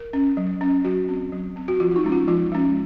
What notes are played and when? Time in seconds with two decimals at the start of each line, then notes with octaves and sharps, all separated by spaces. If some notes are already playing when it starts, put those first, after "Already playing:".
Already playing: A#4
0.13 C#4
0.37 F#3
0.61 C#4
0.85 F#3 F#4
1.09 C4
1.32 F#3
1.56 C4
1.68 F#4
1.80 F3 F4
1.91 F4
1.96 D#4
2.04 G#3 C#4
2.12 F4
2.28 F3 F4
2.52 G#3 C#4